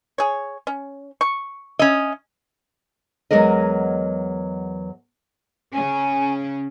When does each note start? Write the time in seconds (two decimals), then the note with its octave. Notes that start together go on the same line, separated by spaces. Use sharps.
0.18 G#4 C#5
0.67 C#4
1.21 C#6
1.79 C#4 D#5
3.31 E2 F#3 G#3 A#4 D#5
5.73 C#3 C#4 G#5